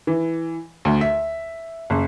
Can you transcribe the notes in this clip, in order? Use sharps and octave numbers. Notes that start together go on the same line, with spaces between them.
E3
D2
E5
F#1